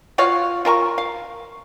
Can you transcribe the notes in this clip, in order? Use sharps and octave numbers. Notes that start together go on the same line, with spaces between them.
F4 F#4 C#5 F5
F4 A#4 A5 C#6
F5